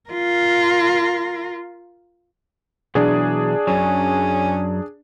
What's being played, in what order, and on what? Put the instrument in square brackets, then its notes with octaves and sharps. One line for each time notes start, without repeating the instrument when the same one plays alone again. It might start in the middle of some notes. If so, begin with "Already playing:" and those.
[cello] F4 A#4
[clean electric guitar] B2 E3 F#3 [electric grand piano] D4 G#4
[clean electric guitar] F#2 F#3 [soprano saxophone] C#4